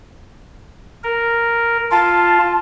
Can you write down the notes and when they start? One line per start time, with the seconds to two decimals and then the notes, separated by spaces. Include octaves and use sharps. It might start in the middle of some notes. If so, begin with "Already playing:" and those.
1.04 A#4
1.91 F4 A5